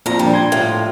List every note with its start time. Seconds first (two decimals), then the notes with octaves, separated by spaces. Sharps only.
0.06 F2 A#2 A#5
0.19 A#2 F3 G3 D4
0.34 C6 G#6
0.52 A2 F4